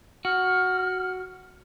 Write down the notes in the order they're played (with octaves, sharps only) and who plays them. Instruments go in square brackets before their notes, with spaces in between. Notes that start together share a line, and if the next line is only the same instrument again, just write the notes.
[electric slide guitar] F#4 [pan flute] F6